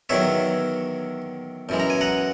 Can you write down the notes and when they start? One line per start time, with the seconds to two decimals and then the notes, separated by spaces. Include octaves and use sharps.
0.09 E2 D#3 F#3 C#5 E5
1.69 F#2 E3 G#3
1.80 A#5
1.90 G#5
2.01 F#5 A#5